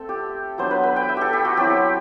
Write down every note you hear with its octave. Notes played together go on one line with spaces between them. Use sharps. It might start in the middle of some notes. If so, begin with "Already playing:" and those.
Already playing: A3 C4 A4
G4
F#3 B3 D4 C5
B4
B4
G5
E5
G4 A4
G4
F#4
F#3 C4 E4 G4